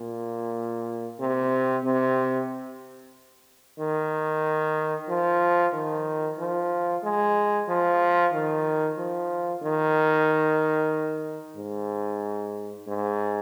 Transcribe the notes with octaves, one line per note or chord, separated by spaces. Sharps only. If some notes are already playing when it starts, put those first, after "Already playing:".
Already playing: A#2
C3
C3
D#3
F3
D#3
F3
G#3
F3
D#3
F3
D#3
G#2
G#2